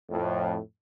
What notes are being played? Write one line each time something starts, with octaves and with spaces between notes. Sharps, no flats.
F2 A2